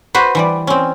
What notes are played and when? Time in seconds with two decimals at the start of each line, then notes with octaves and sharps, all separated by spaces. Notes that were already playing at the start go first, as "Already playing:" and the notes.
0.15 F#4 B4 C5
0.35 E3 G3 D5
0.67 C4 C#4